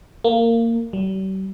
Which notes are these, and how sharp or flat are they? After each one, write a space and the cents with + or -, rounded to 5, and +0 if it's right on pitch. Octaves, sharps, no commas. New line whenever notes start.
A#3 -20
G3 -45